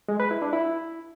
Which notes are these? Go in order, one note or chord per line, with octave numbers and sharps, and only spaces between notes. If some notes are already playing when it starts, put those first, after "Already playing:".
G#3
B4
E4
D4
E4